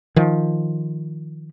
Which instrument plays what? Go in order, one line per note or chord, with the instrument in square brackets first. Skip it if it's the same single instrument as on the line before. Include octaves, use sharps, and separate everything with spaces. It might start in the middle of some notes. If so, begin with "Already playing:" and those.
[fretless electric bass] D#3 F3